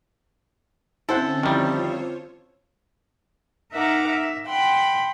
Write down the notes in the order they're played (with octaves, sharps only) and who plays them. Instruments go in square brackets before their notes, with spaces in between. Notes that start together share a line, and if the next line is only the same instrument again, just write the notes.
[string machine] D3 C4 C#4 [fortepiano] E4 C5 F#5 [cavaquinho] A4
[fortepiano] F2 E4 [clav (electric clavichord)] D#3 G3 [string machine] F4 C5 C#5
[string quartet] D#4 A#4 E5 F#5 A#5 D6
E5
F#5 G5 B5 C6